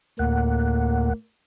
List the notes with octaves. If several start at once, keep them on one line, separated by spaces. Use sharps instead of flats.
D2 A2 A#3 F#5